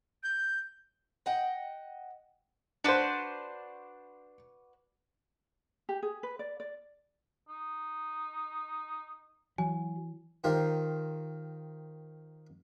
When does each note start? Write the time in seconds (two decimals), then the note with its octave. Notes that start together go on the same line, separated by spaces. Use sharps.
0.23 G6
1.26 D#5 F#5 G5
2.84 D4 F#4 B4 C5 D5
5.89 G4
6.03 G#4
6.23 B4
6.39 D5
6.60 D5
7.49 D#4
9.58 E3 F#3 G#5
10.44 D#3 F4 G4 A#4 C5